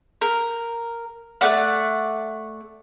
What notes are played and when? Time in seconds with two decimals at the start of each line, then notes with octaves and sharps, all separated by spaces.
0.21 A#4
1.41 A3 D5 F#5 F#6